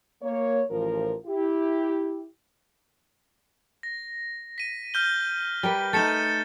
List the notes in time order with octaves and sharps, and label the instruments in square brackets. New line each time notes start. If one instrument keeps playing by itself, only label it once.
[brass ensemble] A#3 C#5
A1 D#2 F3 A#4
E4 G4
[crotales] A#6
B6 D#7
F6 G6 G7
[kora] G3 A#4 B4 [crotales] G7
[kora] A3 D#4 [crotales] A6 C#7 E7